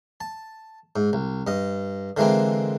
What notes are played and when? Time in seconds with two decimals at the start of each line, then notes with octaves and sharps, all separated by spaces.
0.21 A5
0.96 G#2
1.13 C2
1.47 G2 D#5
2.17 D3 E3 G#3 A#3 C4